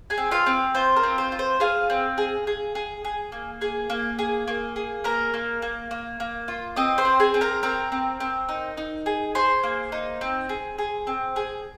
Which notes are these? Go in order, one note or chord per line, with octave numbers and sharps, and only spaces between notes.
G#4 G#5
C4
F4 F5
C4
F4 C5
A#4
C4
C5
F4
C5
F4 G#4 F5
C4
G#4
G#4
G#4
G#4
A#3
G#4
A#3
G#4
A#3
G#4
A#3 A#4 A#5
A#3
A#3
A#3
A#3
F4
C4 D#5 D#6
C5 C6
C4
G#4 G#5
C4
A#4 A#5
C4 A#4 A#5
C4
C4
D#4
D#4
G#4
G#4 C5 C6
A#3
D#4
C4
G#4
G#4
C4
G#4